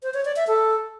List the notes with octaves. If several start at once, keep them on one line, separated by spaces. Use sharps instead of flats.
C5
C#5
D5
E5
A4